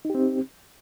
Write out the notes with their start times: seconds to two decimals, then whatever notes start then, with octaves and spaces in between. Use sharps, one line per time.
0.05 D#4
0.10 G4
0.15 C4